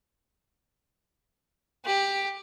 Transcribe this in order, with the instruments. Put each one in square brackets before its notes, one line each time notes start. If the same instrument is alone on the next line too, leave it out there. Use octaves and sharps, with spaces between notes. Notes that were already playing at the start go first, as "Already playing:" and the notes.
[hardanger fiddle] G4